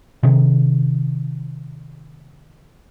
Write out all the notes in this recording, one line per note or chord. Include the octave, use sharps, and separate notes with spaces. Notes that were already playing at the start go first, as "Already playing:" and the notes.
C3 D#3